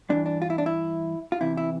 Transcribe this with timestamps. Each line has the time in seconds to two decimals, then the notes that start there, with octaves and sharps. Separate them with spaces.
0.09 G2 E3 D4
0.26 D4
0.42 F4
0.50 E4
0.58 D4
0.66 E4
1.32 F4
1.41 E2 C3 E3 E4
1.57 E4